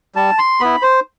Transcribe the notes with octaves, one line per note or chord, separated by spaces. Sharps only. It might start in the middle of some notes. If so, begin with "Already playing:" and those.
G3 A5
C6
B3 E4 B5
C5